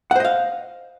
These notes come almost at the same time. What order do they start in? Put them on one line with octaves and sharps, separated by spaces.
F#5 C5 D#5 F5